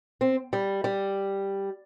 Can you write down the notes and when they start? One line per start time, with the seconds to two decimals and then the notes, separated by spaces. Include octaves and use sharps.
0.21 C4
0.53 G3
0.84 G3